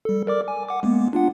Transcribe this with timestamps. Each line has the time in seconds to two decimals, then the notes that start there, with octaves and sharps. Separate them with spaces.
0.05 G3 A4
0.27 A#4 D5 D6
0.48 G#5
0.69 F#5 D6
0.83 G#3 A#3 B3
1.13 D4 F4 F#5